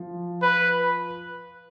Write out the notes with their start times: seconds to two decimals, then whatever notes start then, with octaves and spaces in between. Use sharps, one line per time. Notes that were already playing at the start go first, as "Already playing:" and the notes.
Already playing: F3
0.42 B4